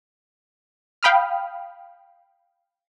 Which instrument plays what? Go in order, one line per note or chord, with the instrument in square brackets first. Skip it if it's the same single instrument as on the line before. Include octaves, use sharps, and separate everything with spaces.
[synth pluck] F5 G5 B5 D#6 F6